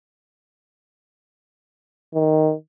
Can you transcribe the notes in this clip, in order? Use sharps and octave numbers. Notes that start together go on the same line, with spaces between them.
D#3